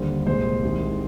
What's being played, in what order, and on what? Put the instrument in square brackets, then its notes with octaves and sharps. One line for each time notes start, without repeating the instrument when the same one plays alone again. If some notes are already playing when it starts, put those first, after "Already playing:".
Already playing: [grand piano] D#2 D3 G3 C5
C2 A#2 G#3 C5
C2 C3 D#3 G#3